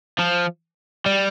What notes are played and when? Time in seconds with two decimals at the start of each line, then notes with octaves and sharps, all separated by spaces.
0.19 F3
1.06 G3